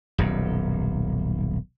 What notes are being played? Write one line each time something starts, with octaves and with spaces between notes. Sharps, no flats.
D#1 B1 F#2